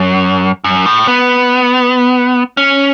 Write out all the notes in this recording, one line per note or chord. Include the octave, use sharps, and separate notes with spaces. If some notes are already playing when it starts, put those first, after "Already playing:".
Already playing: F#2
F#2
A2
B3
C#4